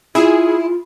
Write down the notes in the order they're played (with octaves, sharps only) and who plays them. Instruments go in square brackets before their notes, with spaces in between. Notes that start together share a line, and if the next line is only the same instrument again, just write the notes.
[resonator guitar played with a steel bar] E4 [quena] F4 [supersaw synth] G#4